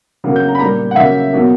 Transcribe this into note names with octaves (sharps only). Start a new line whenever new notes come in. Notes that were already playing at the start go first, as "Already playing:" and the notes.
C#3 F#3 A#3
G6
A#5
B5
A#2 G3 A#3 A#5
F#5
C#3 F#3 A#3 E5
B2 F#3 A#3